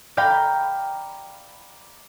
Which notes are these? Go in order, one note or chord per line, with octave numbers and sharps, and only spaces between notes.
D5 F5 G5 A#5 B5